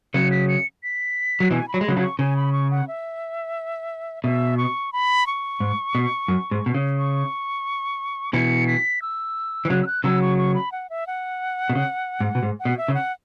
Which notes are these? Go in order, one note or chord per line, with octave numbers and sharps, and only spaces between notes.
C#3 F#3 C#7
B6
C#7
B6
F#3
B2 E3 G#5
B5
F#3
G#3
C#3 F#3 B5
C#3 F#3
C#6
C#3 G#5
B5
C#6
F#5
E5
B2 E5
C#6
B5
C#6
G#2
B2
F#2
G#2
B2
C#3
C#6
B2 E3 C#7
B6
E6
E3
C#3 F#3 F#6
E6
F#6
C#3 F#3 E6
C#6
C#6
B5
F#5
E5
F#5
B2
C#3
G#2
B2
G#2
F#5
B2
E5
C#3
F#5